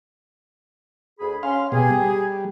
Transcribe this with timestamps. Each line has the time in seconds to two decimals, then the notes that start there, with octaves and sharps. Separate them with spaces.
1.20 D2 G#4 B5
1.43 C#4 F5 C6
1.72 B2 G4 G#4
1.91 G3